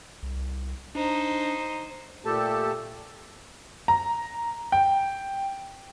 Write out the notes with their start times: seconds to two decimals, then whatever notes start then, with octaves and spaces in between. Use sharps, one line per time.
0.23 C2
0.95 D4 D#4 C5
2.25 A#2 A3 G4 A4 A5
3.88 A#5
4.72 G5